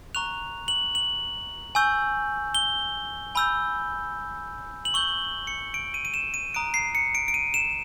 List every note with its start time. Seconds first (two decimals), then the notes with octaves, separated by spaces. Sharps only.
0.15 A#5 C#6 F#6 F7
0.68 F#7
0.95 F#7
1.75 G#5 C#6 E6 G6
2.55 G7
3.35 G#5 B5 E6 G6
4.85 F#7
4.94 C#6 E6 G6 G7
5.47 C#7
5.74 D7
5.94 D#7
6.05 D#7
6.14 E7
6.34 D#7
6.54 A#5 D#6 F#6 D7
6.74 C7
6.95 C#7
7.15 D7
7.28 D7
7.34 D#7
7.54 E7